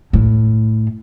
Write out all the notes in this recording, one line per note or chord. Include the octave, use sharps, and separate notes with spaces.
A2